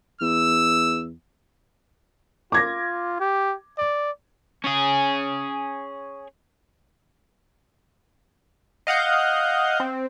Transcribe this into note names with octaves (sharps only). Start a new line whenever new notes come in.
E2 E6
F4 D6 G#6 A#6
G4
D5
C#4 G#4
D#5 F5 F#5 G6
C4